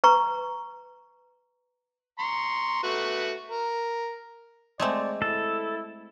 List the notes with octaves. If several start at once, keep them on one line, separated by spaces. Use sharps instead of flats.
B4 A#5 C#6
A#5 C6 C#6
A3 F#4 B4
A#4
G#3 A3 C4 D5
E4 A4